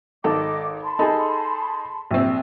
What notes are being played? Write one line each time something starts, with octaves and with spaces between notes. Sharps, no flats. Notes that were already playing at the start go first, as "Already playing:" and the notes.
G#1 A4 D#5 D6
A5 B5 C6
D#4 G#4 A4
A#1 C4